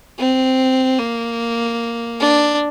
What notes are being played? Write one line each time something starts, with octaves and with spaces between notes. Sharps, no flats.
C4
A#3
D4